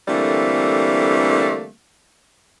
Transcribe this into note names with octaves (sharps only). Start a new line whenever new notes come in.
D3 E3 G3 A3 A#3 C4